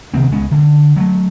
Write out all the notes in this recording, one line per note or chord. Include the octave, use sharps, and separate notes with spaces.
C3 D#3 B3 C4
C#2 G#3 B3 C#4
D3
F#3 G#3 A3